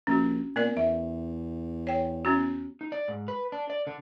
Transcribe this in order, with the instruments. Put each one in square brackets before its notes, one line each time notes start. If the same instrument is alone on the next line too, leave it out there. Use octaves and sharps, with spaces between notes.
[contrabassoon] A#1 [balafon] C#4 F#4
[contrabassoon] A#2 [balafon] B3 A#4 D5
[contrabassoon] E2 [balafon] E5
[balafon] C#5 G5
B3 C#4 F#4
[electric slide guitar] D#4
D5
G#2
B4
D4
D5
D3